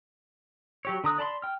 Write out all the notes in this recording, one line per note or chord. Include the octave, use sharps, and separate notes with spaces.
F#3 G4 C#5
D3 A#5 D#6 F#6
D5 A5 B5 C6
G5 F6